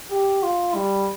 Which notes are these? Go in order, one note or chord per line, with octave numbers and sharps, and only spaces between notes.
G4
F4
G3